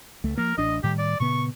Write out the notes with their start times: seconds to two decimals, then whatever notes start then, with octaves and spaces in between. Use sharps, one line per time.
0.24 C#2 A3
0.37 F3 A#3 A#4
0.58 A1 D4 D#5
0.83 A2 D#3 G3 G4
0.98 D5
1.20 A#2 C#3 B3 C#6